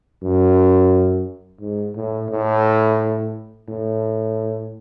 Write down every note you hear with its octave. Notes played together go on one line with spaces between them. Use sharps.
F#2
G#2
A2
A2
A2